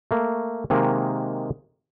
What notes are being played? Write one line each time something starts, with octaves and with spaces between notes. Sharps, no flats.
A3 A#3
C3 D#3 G#3 A#3